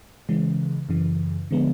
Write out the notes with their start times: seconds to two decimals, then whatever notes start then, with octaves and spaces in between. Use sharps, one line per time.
0.29 C#3 E3 G#3
0.89 F#2 C#3 E3
1.51 D3 F3 G#3 B3